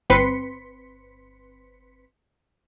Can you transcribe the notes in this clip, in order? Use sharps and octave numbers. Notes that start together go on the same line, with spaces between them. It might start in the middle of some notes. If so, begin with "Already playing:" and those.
G1 C4 B4 C6 B6 C#7